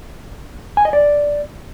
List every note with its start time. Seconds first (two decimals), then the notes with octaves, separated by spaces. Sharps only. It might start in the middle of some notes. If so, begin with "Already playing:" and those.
0.77 G#5
0.85 D#5
0.93 D5